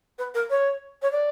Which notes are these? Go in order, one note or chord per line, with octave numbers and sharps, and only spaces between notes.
B4
A#4
C#5
C#5
D5